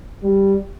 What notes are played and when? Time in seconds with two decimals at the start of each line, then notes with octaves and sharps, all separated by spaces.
0.23 G3